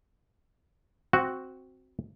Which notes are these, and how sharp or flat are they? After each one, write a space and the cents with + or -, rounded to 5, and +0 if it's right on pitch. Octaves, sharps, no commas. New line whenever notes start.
C4 +0 F#4 +0